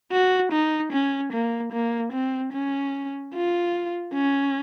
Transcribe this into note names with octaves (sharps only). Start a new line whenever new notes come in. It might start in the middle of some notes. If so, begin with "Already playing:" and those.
F#4
D#4
C#4
A#3
A#3
C4
C#4
F4
C#4